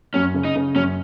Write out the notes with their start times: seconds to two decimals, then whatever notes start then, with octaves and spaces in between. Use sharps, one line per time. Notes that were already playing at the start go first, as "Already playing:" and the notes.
0.14 F#2 C#4
0.34 C#3
0.45 D#4
0.55 C#3
0.75 F#2 C#4